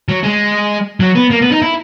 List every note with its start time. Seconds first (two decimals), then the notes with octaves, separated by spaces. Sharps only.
0.08 F#3
0.23 G#3
1.00 F#3
1.15 B3
1.30 A#3
1.42 B3
1.51 D#4
1.62 E4